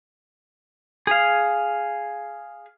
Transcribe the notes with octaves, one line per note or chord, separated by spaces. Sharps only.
G#4 F5